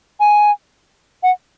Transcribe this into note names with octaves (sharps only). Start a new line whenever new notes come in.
G#5
F#5